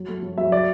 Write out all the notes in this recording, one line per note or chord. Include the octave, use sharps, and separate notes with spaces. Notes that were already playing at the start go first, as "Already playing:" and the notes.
Already playing: F#3
A3
F#3
F#3 E5
D5